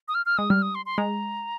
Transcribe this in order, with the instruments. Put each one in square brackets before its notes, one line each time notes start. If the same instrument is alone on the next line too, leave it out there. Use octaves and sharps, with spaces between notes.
[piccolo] D#6
F6
F6
[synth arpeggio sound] G#3 [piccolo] D#6
[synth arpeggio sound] G3 [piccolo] F6
[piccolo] D#6
C6
C6
[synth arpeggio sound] G#3 [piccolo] A#5